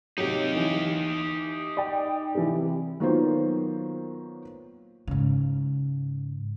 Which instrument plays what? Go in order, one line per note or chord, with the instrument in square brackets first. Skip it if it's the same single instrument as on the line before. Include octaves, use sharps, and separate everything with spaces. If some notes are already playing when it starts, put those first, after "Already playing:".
[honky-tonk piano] C3 F#3 [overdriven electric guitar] D#4 G4
[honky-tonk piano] E3
D5 G5
C3 E3
[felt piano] D#3 F#3 A#3 B3 F4 C5
[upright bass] G#2 C#3